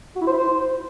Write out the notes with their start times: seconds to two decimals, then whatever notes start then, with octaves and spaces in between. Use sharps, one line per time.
0.16 F#4
0.21 E4
0.27 C5
0.32 E4
0.38 C5